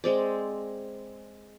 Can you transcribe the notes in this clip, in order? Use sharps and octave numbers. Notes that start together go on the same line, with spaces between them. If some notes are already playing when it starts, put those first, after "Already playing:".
G#3 C4 D5